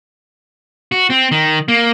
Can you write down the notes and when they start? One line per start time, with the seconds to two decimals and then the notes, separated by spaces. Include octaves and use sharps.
0.92 F#4
1.10 C4
1.32 D#3
1.68 A#3